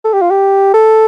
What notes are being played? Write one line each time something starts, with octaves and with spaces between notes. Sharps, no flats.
A4
G4
F4
G4
A4